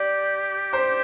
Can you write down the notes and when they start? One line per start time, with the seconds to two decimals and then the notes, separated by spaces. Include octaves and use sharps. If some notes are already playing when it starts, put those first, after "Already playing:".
Already playing: G4 D5
0.73 C5